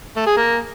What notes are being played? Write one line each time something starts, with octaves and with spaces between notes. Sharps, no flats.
A3
G#4
A#3